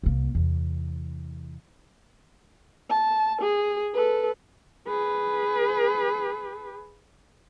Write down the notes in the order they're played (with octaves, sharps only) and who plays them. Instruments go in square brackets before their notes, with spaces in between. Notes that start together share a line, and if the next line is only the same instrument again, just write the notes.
[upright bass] C2 A#3
E2 C3
[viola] A5
G#4
A4 B4
[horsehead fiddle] G#4 B4